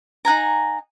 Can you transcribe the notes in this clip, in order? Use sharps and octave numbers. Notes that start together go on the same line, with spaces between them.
D#4 F#5 G#5 A#5